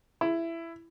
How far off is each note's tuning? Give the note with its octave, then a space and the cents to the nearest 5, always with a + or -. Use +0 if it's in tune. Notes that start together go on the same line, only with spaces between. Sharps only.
E4 +15